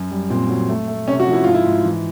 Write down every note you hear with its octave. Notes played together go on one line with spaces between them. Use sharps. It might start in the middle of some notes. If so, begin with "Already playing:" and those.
Already playing: F#2
G3
A#2 C4
F#3
A3
A3
C3 C#4
F#4
F3
E4
G#2 F4
E4
G#2
E3